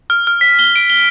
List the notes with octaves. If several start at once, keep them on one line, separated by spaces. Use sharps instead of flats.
F6
F6
B6
G7
D7
G7